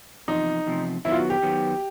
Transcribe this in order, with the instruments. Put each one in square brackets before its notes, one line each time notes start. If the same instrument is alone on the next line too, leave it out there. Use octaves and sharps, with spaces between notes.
[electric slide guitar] E2 C3 F3 [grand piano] D#4
[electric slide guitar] E2 C3 F3
[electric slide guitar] D#3 F#3 B3 [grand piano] E4
[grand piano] F4
F#4
G4
[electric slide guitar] D#3 F#3 B3